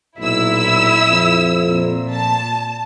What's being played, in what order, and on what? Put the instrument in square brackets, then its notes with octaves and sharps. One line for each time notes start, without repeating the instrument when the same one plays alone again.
[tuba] B1 [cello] A#2 E5 [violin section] E4 E6
[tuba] F2
[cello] A#2
[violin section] A5